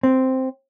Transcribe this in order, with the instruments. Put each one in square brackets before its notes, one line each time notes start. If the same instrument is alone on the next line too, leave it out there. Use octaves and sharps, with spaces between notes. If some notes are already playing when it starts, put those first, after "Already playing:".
[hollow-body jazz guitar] C4